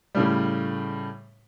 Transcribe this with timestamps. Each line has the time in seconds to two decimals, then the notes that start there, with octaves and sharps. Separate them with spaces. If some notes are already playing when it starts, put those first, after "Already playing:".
0.15 A2 C#3 G3